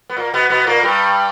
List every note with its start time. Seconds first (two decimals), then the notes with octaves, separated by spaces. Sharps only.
0.10 B3
0.17 A#2 A#3
0.34 B2 B3
0.50 B2 B3
0.67 A#2 A#3
0.83 G2 G3